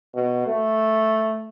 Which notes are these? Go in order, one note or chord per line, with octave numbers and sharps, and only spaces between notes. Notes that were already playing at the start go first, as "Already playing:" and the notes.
B2
A3